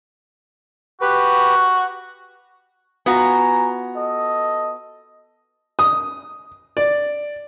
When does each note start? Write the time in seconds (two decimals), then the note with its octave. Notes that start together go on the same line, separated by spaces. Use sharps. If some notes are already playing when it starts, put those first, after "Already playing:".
1.01 F#4 G4 B4
3.06 B3 F4 F#4 G#5 A#5
3.94 A4 D#5
5.79 D#6
6.77 D5